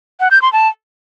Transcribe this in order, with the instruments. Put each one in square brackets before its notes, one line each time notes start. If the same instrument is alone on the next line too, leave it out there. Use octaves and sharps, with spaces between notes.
[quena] F#5
G6
C6
A5